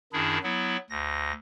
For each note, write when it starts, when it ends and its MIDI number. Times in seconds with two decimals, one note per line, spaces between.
0.13 0.38 42
0.13 0.38 51
0.13 0.38 62
0.13 0.38 64
0.13 0.38 68
0.43 0.77 54
0.43 0.77 59
0.43 0.77 64
0.90 1.32 38
0.90 1.32 94